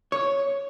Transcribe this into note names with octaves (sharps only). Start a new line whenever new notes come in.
C#5